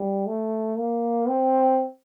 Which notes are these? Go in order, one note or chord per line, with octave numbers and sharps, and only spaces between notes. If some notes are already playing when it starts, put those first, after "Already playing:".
Already playing: G3
A3
A#3
C4